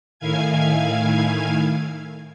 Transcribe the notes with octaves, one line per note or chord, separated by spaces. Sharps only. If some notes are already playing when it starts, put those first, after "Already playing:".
A2 D#3 E4 F5 G#5 G#6